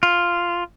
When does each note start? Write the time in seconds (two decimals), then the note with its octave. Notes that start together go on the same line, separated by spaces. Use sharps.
0.03 F4